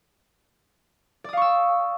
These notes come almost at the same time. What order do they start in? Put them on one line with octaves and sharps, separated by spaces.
D5 D#6 F5 C#6 E6